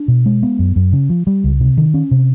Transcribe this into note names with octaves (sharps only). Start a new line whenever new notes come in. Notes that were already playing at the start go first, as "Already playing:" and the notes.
Already playing: D4
B2
G#3
B3
F#2
F#2
C#3
F3
G3
C#2
C3
D#3
C#4
C3